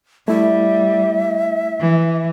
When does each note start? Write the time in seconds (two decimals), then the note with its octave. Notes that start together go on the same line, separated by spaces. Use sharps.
0.28 G3 A3 E4 E5
1.80 E3